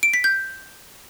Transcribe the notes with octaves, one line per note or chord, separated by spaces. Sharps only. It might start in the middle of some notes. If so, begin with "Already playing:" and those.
D7
B6
G6